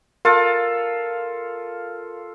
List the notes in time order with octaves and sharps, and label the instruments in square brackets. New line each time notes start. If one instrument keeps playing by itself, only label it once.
[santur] F4 A4 [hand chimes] A#4 F5